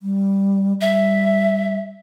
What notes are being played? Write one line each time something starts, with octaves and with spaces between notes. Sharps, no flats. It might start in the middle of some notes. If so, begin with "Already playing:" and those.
G3
G3 E5